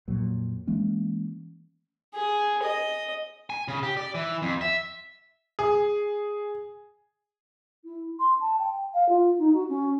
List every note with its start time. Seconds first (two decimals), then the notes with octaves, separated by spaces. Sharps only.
0.08 F2 A#2 F#3
0.67 E3 G#3 A#3 C#4
2.15 G#4
2.63 D#5
3.50 G#5
3.68 C#3
3.83 G4
3.97 D5
4.15 E3
4.42 F2
4.61 E5
5.59 G#4
7.85 E4
8.20 C6
8.41 A5
8.59 G5
8.94 F5
9.09 F4
9.39 D#4
9.53 F#4
9.69 C#4